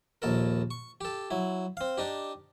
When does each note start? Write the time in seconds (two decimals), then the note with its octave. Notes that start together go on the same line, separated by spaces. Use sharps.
0.22 A#1 D#2 A4 A#4
0.71 C#6
1.01 G4 A4
1.31 F#3 E4
1.77 C4 F5
1.98 D4 D#4 G4